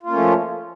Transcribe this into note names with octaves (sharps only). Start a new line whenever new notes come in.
F3 A3 A#3 C#4 F4